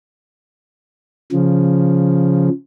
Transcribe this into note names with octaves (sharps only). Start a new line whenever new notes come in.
C#3 F3